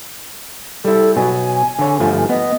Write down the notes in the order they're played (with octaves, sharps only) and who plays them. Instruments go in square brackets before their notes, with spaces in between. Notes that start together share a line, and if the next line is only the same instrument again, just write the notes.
[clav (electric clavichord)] G3 E4 [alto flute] A4
[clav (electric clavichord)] B2 F#3 [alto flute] G#5
[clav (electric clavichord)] D3 C#5
G1 F3 A3
[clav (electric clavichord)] B3 [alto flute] D#5